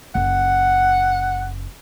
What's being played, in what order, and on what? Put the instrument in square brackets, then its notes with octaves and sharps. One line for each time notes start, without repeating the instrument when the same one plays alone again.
[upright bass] F#1 [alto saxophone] F#5